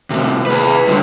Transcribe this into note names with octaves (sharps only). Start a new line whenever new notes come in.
A2 C3
G#4 B4
G2 D3